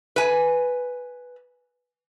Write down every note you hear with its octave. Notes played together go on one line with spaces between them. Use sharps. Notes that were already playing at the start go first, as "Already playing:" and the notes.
B4 G#5